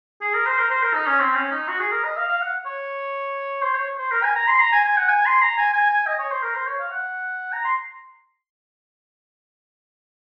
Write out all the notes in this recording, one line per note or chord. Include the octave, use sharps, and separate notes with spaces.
G#4
A#4
C5
A#4
C5
A#4
D#4
C#4
C4
C#4
D#4
F#4
G#4
A#4
D#5
F5
F5
F#5
C#5
C5
C#5
C5
A#4
G#5
A#5
C6
A#5
G#5
G#5
F#5
G#5
C6
A#5
G#5
G#5
G#5
D#5
C#5
C5
A#4
C5
C#5
F5
F#5
A#5
C6